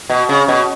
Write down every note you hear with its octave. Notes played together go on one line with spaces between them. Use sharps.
B2
C#3
B2